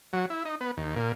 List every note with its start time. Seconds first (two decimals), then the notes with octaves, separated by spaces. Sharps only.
0.13 F#3
0.30 E4
0.45 D#4
0.61 B3
0.77 D#2
0.96 A#2